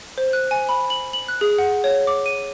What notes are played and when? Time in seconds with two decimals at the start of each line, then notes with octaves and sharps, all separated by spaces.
0.18 C5
0.33 F#6
0.51 G#5
0.69 B5
0.90 F#7
1.13 F#7
1.28 F#6
1.41 G#4
1.58 F#5
1.84 C#5
2.07 D6
2.26 D#7